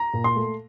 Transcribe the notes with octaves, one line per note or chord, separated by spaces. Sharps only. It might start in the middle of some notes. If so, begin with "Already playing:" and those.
Already playing: A#5
A#2
C6
A3